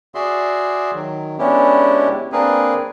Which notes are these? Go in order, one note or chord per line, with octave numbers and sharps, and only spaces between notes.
F#4 G#4 D5 E5 C6
D#3 F#3
G#3 B3 C#4 D4 E4 G4
A#3 C4 D4 G#4 A#4 B4